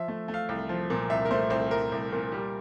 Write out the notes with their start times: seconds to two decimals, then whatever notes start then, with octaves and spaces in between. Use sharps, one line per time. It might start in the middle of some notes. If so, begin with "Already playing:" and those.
Already playing: F3 E5
0.08 A3
0.28 A3
0.34 F5
0.49 C2
0.69 F3
0.90 A#2
1.10 C2 E5
1.25 A#4
1.31 A3 C5
1.50 C2 C5
1.71 C2 A#4
1.92 C2
2.13 A#2
2.32 G3